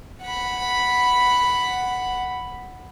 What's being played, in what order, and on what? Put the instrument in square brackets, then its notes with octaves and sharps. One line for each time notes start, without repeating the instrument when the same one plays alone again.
[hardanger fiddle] F#5 B5